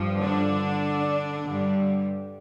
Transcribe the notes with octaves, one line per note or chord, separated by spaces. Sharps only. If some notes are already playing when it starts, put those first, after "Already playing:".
Already playing: G2 F3
D3 D4
G2 D3 G3